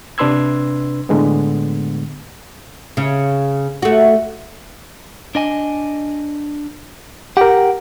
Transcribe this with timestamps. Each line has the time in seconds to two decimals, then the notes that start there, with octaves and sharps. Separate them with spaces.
0.18 C3 D4 B4 C6 E6 G#6
1.09 A2 D3 G#3 B3
2.97 C#3
3.82 A3 F#4
5.35 D4 D#5 G#5
7.37 G4 A#4 F#5 G5